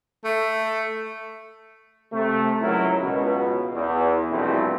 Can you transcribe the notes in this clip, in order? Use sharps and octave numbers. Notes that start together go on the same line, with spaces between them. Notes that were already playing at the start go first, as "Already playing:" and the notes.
A3
C3 A3
C#2 F#3 E4 A#4
C#2 B2
E2
A#1 G2 B2 A3 C4 E4